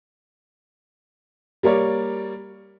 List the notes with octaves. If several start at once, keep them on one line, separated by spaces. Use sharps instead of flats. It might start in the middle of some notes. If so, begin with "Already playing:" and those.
G3 A#3 A#4 C#5 D5